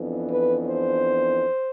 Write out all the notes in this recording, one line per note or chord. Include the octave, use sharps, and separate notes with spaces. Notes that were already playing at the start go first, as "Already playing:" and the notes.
Already playing: F2 E3 B3 D4
B4
C5